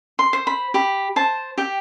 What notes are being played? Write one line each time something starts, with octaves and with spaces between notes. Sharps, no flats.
C6
C5
B5
G4 B5
C5 A5
G4 G5